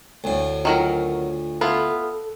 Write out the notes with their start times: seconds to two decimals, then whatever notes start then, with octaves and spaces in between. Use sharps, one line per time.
0.24 D2 A2
0.65 D#3 F#3 F4 A#4
1.61 B3 E4 F4 A4